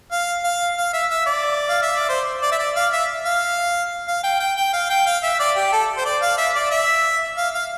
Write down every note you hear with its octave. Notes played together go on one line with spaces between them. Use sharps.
F5
F5
F5
E5
E5
D5
F5
E5
D5
C5
D5
E5
D5
F5
E5
F5
F5
G5
G5
G5
F5
G5
F5
E5
D5
G4
A4
C5
D5
F5
E5
D5
E5
F5
F5